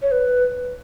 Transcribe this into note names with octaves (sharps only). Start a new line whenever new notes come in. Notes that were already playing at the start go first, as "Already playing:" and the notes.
C#5
B4